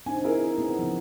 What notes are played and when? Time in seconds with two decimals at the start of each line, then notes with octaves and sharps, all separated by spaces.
0.06 C4 D4 D#4 G#5
0.24 E4 G#4 A#4
0.58 B3
0.79 C#3 F3